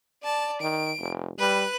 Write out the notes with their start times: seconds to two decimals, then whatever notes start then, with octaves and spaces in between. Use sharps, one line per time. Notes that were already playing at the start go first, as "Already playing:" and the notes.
0.23 D5 A5
0.61 D#3 D7
0.99 F1
1.39 G3 B4 F#6